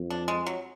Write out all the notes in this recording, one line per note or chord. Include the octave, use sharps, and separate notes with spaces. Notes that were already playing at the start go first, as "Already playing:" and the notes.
Already playing: F2
D4
G#3
F#3